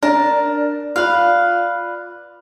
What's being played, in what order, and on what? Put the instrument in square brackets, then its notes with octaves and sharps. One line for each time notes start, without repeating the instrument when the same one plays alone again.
[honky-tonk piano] D4 [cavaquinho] A#4 A5
[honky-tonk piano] F4 D5 [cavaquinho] B4 F5